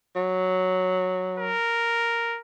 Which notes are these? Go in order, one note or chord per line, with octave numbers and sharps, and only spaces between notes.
F#3
A#4